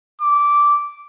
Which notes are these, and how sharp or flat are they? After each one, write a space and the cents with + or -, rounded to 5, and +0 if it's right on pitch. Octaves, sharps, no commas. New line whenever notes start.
D6 -10